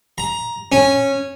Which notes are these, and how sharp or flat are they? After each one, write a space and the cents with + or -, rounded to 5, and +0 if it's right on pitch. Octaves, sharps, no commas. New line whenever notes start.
A#5 +15
C#4 -10